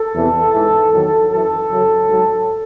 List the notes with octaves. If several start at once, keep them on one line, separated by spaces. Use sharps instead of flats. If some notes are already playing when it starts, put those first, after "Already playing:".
Already playing: A4
E2 C3 E3
G#2 E3
E2 D#3 F#3 A4
F#2 E3 A4
F#2 C#3 F#3
G#2 F#3